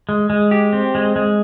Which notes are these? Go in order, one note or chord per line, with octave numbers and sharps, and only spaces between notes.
G#3
G#3
G4
C4
G#3
G#3